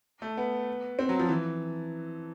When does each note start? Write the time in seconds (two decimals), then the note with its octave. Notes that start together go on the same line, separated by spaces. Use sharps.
0.22 A3
0.37 B3
0.99 C4
1.09 F#3
1.19 F3
1.29 E3